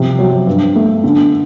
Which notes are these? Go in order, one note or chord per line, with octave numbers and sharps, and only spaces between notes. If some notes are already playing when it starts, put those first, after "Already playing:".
Already playing: C3 F3
F#3
G2
A3
D3